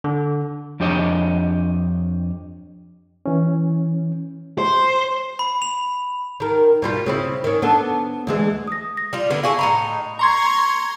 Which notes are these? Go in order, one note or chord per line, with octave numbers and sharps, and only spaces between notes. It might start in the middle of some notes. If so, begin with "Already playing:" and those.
D3
F2 D4 G4 C#5 D#5
E3 C#4
C5
B5
F7
D#3 A#4
B2 G3 F4
C#3 C4 E4
D#3 C#4
B3 D4 A4
D2 E3 G#3
D#6 A#6
A#6
G3 F4
D3 B3 E4
E4 G#4 A4 F5 C#6
A2 D#4 A#5 B5 C#6
A#5 C6 C#6 G#6